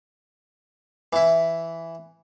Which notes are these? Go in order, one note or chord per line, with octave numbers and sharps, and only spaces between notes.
E3 E4